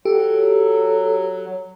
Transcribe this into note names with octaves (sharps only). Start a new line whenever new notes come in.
F#3 G4 A4